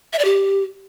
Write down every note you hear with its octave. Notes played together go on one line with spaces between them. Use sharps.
E5
D5
G4